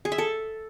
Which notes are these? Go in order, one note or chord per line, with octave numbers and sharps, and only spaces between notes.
G#4
E5
A4